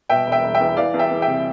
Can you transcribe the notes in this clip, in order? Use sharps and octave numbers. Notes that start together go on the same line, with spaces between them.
B2 E5 G5
E1
E5 G5
E1
E5 G5
E2
E3 D5 F5
E2
E5 G5
E2
E5 G5
C3